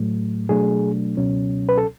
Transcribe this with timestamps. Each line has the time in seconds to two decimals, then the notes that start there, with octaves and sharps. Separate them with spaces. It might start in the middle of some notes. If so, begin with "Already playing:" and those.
Already playing: A2 F#3 A3
0.49 B2 F#3 A3 D4 G#4
1.17 C#2 B2 F#3 C#4
1.69 B4
1.78 A4